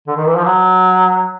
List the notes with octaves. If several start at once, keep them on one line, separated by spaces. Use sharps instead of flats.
D3
D#3
E3
F3
F#3